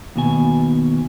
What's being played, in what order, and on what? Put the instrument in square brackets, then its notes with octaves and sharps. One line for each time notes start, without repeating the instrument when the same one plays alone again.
[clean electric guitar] D#2 B2 G#5